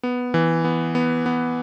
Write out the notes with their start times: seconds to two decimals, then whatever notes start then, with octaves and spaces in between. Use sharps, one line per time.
0.03 B3
0.34 E3
0.64 B3
0.95 B3
1.26 B3